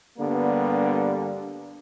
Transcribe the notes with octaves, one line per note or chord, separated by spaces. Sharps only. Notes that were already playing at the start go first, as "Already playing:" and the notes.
G2 D3 G3 A#3 B3